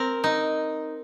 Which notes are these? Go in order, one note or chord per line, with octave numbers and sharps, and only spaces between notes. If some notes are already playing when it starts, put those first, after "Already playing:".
Already playing: C4 A#4
D#4